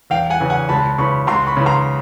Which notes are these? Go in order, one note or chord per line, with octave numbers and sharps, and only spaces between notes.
E2 F5 G5
F#5 G#5
C#3 E3
F#5 G#5
C#2 A5 B5
C#3 E3 B5 C#6
C#2 A#5 C6
B5 C#6
C#3 E3
A#5 C6